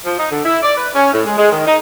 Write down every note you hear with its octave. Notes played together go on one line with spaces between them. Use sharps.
F3
D#4
D3
E4
D5
B4
C#4
A2
G#3
G#3
D#3
D#4